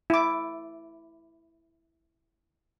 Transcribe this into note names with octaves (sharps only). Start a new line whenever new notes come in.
E4 D6